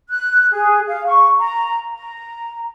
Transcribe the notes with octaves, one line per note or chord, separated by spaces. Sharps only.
F#6
G#4
F5
C#6
A#5
A#5